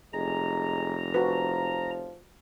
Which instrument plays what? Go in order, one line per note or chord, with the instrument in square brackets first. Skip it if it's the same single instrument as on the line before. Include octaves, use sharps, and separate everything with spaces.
[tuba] F1 [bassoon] G#3 [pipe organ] A#5
[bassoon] F3 [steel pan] F#4 B4